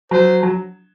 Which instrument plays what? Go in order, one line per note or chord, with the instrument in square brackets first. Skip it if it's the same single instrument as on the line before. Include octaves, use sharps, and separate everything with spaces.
[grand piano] F#3 [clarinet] C5
[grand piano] F#3